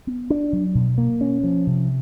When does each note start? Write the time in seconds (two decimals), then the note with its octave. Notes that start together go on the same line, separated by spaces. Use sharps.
0.07 B3
0.30 D4
0.53 F#3
0.75 B2
0.98 A#3
1.21 C#4
1.44 F3
1.67 C3